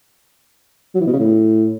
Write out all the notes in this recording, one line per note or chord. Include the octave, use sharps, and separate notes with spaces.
F#3
E3
B2
C#3
A2